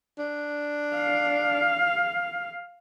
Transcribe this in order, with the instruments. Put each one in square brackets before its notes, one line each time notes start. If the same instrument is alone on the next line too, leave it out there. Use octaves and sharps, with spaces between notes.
[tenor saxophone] D4
[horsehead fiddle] F5